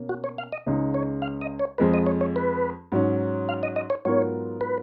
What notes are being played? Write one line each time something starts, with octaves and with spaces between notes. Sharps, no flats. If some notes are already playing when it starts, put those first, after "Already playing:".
Already playing: B2 A#3 C#4
F#4
C#5
F5
D#5
C#2 C#3 G#3 D#4
C#5
F5
D#5
C#5
F2 F3 G#3 B4
D#5
C#5
C#5
B4
G#2 F#3 C#4
F5
D#5
D#5
C#5
G#2 F#3 B3 F4 A#4 C#5
B4